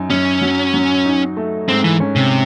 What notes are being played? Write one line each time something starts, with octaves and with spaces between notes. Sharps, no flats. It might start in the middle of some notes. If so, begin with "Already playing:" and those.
Already playing: F#2 D#4
F#2 C#4
F#3
F#3
D#4
A3
G#2 C4
E3
C#4
C3